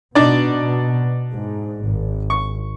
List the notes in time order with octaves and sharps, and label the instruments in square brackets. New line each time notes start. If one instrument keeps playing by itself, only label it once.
[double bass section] B2 [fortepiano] D4 D#4 D5
[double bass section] G#2
G#1
[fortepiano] C#6